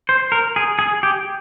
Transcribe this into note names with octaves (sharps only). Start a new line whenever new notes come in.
C5
A#4
G#4
G#4
G4